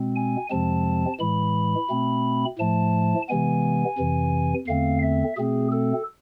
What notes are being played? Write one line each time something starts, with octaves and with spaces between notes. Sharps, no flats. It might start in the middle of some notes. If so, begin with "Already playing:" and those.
Already playing: B2 G#3 C4
G#5
F2 C3 F3 G#3 C4 A5
A2 E3 G#3 B5
B2 A3 C4
A2 F3 A3 A5
C3 E3 G#3 B3 G#5
F2 C3 E3
E2 D3 A3 C4 F5
E5
B2 A3 C4 G#4
A4